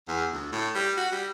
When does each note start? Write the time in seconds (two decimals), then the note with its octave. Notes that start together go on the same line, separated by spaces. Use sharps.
0.08 E2
0.33 D2
0.52 A2
0.75 G3
0.97 F#4
1.12 G3